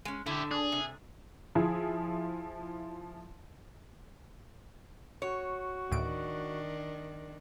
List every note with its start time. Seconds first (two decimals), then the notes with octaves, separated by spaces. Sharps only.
0.05 G#3 C#4
0.26 D3 E4 G4
0.51 D4 G#4
0.72 C3
1.55 F3 E4 G#4
5.22 F#4 C#5
5.91 D2 A2 D#3 D4 D7